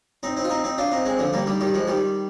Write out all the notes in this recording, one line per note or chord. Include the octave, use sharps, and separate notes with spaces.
C4 D#4
C4 D#4
F4
C4 D#4
C4 D#4
D4 F4
C4 D#4
G#3 C4
D3 F3
G3 A#3
D#3 G3
D#3 G3
F3 G#3
D#3 G3